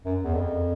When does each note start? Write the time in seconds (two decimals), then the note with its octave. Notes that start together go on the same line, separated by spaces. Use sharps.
0.05 F#2
0.24 E2
0.34 F2